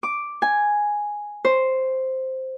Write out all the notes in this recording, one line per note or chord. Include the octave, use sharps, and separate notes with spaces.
D6
G#5
C5